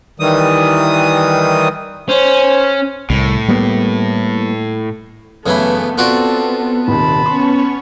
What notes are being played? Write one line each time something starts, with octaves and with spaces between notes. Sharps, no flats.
D#3 E3 G3 D#6
C#4 C5
C2 A2
G3 A#3 B3
F#2 C#3 E3 A3 B3 E4 B5
C4 F4 F#4 A4 B4 D5
D#1 C3 D#3 A5 B5
B3 C#4 C#5 C6